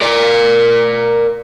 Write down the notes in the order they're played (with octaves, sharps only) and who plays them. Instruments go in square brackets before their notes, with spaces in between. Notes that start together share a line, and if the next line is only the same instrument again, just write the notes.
[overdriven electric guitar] A#4 D5